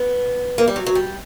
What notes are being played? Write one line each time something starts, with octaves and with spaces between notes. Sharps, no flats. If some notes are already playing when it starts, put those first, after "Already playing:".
Already playing: B3
A#3
G3
F#3
F#3
G3